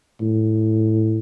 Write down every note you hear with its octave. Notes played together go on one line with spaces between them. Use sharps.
A2